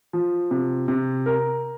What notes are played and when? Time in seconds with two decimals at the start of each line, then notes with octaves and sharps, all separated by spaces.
0.13 F3
0.51 C3
0.88 C3
1.26 A#4